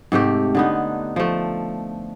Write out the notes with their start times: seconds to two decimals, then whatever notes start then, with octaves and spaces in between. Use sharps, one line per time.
0.12 G#2 C3 A3 G4
0.55 D3 B3 D#4
1.16 F3 A3